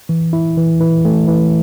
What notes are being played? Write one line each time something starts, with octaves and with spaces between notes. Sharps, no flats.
E3
E4
E3
E3
A3
E3